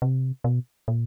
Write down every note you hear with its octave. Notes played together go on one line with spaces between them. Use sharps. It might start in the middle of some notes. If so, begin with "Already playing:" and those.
C3
B2
A#2